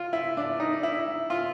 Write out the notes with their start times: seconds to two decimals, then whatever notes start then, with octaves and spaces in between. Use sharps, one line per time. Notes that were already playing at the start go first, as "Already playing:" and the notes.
Already playing: F4
0.13 E4
0.37 D4
0.60 D#4
0.83 E4
1.30 F4